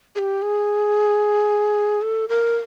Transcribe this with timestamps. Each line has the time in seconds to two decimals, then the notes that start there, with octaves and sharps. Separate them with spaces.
0.15 G#4
0.19 G4
0.42 G#4
2.02 A4
2.29 A#4